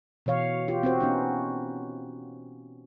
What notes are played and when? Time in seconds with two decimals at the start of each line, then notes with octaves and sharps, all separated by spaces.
0.26 B2 E3 C#5 F5
0.68 F4 G4
0.83 C4 F#4 C5
1.00 B3 C#4 D#4